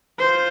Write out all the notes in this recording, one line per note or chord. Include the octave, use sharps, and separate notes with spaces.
F4 C5